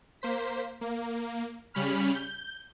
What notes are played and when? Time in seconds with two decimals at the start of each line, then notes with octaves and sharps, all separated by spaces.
0.22 A#3 C5 B6
0.81 A#3
1.74 C#3 G3 C#4 B5 F6
2.15 G6